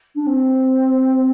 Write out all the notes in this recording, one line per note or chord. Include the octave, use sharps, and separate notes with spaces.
D4
C4